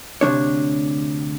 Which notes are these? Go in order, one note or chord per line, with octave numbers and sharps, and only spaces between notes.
D2 C3 F3 D4 C#5